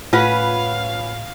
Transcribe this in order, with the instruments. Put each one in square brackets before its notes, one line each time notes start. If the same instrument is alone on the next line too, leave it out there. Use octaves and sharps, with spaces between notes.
[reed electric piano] A2 [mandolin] C#4 B4 F#5 [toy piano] F4 [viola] F5